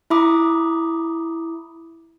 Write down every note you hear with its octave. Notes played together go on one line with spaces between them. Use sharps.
E4 E5 A#5 B5 D6 D#6